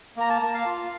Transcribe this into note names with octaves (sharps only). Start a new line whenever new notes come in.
A#3 A#5
A5
A#3 A5
F5
F4